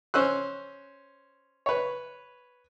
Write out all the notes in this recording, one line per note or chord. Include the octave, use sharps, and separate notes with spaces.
C#4 C5 E6 F#6
B4 C#5